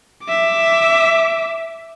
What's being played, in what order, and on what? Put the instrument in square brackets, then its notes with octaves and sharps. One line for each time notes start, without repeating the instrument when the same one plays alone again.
[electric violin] E5 D6